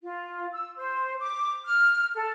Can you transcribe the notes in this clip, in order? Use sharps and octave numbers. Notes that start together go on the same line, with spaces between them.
F4
E6
C5
D6
F6
A4